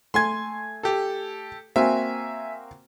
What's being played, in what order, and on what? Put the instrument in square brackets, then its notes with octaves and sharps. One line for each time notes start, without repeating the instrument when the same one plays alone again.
[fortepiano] A3 G#5 [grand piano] C6 G#6
[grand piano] G4 A4
[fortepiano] A#3 C4 F#4 [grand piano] E5 G#5